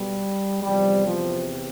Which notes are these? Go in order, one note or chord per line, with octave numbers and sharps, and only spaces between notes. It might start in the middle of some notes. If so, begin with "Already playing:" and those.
Already playing: B1 B2 G3
E2 C3 F3 G3
F3